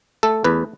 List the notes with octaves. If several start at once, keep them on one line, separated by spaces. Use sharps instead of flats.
A3 A4
E2 B4